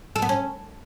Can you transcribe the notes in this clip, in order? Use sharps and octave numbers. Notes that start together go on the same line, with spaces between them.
A4
B3
C#4